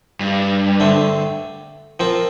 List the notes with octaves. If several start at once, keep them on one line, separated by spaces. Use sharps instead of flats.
G2
D3 A3 C4
F3 C4 F4 A#4